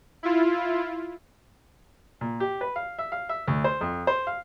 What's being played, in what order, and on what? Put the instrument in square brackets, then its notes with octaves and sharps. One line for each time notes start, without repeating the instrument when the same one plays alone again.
[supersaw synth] E4 F4
[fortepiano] A#2
G4
B4
F5
E5
F5
E5
D2
C5
F2
C5
F5